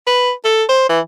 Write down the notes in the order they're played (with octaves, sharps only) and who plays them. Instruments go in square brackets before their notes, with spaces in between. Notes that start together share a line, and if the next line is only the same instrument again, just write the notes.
[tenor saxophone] B4
A4
C5
E3